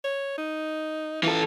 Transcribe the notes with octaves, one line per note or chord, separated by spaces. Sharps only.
C#5
D#4
E3 F4 A4